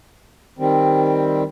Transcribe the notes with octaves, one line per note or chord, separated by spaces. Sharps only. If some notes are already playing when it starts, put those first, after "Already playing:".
D#3 G3 C4